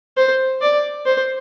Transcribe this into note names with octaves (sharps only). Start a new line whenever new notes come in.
C5
D5
C5